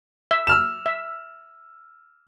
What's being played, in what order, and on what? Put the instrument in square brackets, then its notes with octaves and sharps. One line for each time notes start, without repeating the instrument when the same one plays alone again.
[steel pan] E5
[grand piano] E6 F6 E7
[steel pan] E5